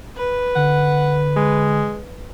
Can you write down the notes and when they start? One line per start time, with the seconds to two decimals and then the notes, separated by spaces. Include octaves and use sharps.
0.16 B4
0.55 D3 F#5
1.36 G#3